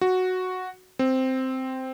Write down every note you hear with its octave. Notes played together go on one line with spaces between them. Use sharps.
F#4
C4